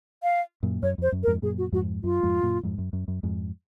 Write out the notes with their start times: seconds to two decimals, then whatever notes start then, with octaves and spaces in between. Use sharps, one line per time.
0.23 F5
0.63 F#2 A#2
0.83 F#2 C#5
0.98 F2 C5
1.12 F#2
1.23 A#4
1.27 F2 G#2
1.42 F#2 A#2 G#4
1.58 F#4
1.72 F2 G#2 F#4
2.03 F#2 F4
2.23 F2 G#2
2.43 F#2 A#2
2.63 F2 G#2
2.78 F#2
2.93 F#2
3.08 F#2
3.23 F2 G#2